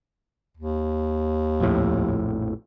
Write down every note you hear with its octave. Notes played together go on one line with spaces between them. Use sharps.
D#2
A#1 F2 A2